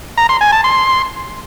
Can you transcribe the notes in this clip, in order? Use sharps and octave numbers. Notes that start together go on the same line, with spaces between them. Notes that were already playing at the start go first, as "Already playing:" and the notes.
A#5
C6
G#5
A5
C6